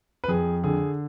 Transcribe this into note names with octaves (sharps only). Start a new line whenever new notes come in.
B4
F2 G#4
D3 G#4